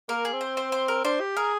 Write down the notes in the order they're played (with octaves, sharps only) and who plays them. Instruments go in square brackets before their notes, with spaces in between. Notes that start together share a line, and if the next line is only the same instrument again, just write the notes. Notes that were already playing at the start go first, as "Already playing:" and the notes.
[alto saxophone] A#3 [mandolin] A#4
[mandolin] G#4
[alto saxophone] C4
[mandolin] C5
C5
C5
A#4
[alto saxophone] D4 [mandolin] C5
[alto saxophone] G4
[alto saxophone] G#4 [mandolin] A#4